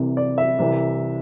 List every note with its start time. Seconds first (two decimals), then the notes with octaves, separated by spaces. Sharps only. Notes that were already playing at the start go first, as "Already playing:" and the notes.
Already playing: C2 C3 E3
0.17 D5
0.38 E5
0.59 C2 C3 E3